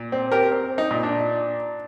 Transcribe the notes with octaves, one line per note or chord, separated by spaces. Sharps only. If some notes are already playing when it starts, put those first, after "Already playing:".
Already playing: A#2
C4
G4 A#4
C4
D#4
A#2
D4